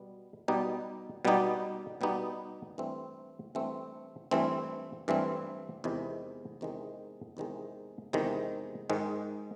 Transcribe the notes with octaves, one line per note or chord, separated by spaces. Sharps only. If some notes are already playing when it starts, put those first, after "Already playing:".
Already playing: B2 G3 B3
B2 G3 B3 D#4 G4
B2 G3 B3 D#4 G4
B2 G3 B3 D#4 G4
G2 E3 A3 C4
G2 E3 A3 C4
G2 E3 A3 C4
G2 E3 A3 C4
E2 C3 D#3 G#3
E2 C3 D#3 G#3
E2 C3 D#3 G#3
E2 C3 D#3 G#3
G#2 D#3 G#3